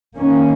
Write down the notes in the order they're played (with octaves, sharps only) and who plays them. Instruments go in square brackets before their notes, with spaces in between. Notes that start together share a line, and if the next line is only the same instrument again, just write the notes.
[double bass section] D#3 A#3 C#4